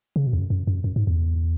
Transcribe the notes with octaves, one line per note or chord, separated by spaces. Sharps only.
C#3
B2
E2
F#2
F#2
F#2
F#2
G#2
E2